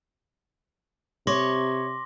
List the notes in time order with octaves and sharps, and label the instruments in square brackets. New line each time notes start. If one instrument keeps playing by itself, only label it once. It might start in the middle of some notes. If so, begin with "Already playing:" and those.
[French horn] C3 [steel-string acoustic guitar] C#5 [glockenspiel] C6 D6 A#6